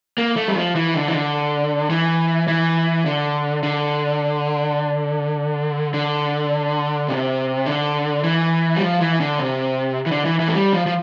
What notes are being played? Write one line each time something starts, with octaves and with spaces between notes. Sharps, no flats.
A#3
A3
G3
F3
E3
D3
E3
D3
E3
E3
D3
D3
D3
C3
D3
E3
G3
F3
E3
D3
C3
E3
D3
E3
E3
A3
G3
F3
F3